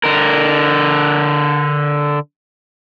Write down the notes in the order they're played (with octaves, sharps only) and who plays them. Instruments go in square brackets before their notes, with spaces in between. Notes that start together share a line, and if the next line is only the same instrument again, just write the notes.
[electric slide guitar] D3 A#4